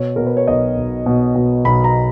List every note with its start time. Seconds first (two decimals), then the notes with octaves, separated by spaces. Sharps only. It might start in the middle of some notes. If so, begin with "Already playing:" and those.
Already playing: B2 C#5
0.16 B2 A#4
0.27 B4
0.37 C#5
0.47 B1 D#5
0.77 B1
1.06 B2
1.35 B2
1.65 B1 B5
1.84 A#5